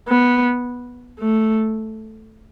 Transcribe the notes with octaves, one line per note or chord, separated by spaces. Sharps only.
B3
A3